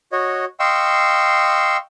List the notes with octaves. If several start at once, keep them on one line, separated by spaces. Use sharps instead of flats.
F#4 C#5 D#5
D#5 F5 G5 C6 C#6 E6